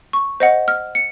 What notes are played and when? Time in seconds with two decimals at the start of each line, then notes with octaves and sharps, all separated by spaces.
0.13 C#6
0.40 C5 D#5 F#5
0.68 F6
0.95 C#7